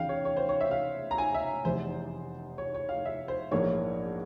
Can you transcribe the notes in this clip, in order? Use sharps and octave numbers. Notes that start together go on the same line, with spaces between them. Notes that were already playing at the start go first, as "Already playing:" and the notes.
Already playing: E1 E2 C#3 F5 G5
C#5
C#5
C5
C#5
E5
F5
A#5
G#5
E5
F1 E2 E3 C5
C#5
C#5
F5
E5
C5
A#1 G#2 E3 A#3 C#5